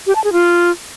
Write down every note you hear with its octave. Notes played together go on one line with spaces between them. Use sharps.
G4
A5
G#4
F4